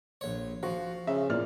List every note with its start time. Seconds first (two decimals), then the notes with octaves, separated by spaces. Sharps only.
0.21 A#1 C#5
0.63 F3 F#4
1.07 C#3 E5
1.29 E2 A#2 D5 F6